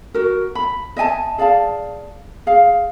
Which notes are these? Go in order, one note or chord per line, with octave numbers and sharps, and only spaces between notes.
F#4 A#4
B5
D#5 E5 G#5 A5
G#4 D5 F5 A5
G#4 F5